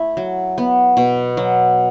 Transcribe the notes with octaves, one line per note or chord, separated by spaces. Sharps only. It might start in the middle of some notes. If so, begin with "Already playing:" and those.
Already playing: A3 E4
F#3
B3
B2
F#3